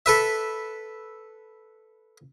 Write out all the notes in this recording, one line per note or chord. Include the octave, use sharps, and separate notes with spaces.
A4 B4 E5